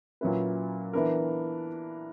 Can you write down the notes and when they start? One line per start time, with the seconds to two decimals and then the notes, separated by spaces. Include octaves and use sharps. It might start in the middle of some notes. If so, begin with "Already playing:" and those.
0.21 A#2 F#3 C#4 E4 B4
0.93 E3 B3 D4 A#4